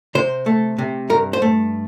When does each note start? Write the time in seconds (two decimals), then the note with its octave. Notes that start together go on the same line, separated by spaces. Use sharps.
0.15 C3 C5
0.46 A3
0.78 C3
1.10 G2 A#4
1.33 C5
1.42 A3